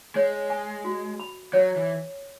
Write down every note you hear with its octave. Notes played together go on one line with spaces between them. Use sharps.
G#3 C#5
G#5
F#4
B5
F#3 C#5
E3